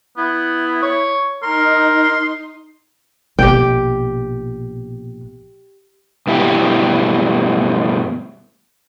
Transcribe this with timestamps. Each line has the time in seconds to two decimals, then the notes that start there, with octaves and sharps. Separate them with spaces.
0.18 B3 E4
0.83 C#5
1.43 D#4 A#4 C6
3.39 A#1 B2 G4 G5
6.27 G2 B2 E4 G4